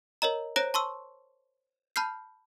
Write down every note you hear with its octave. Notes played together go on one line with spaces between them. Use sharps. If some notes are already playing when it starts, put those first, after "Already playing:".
A#4 C#5 D#5 A#5
C5 C#5 A#5 F#6 A#6 D7
A5 C6 C#6 E6
A5 B5 F6 G6 C7